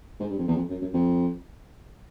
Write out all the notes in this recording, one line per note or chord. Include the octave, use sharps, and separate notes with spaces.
G#2
G2
F2
E2
F2
F#2
F#2
F2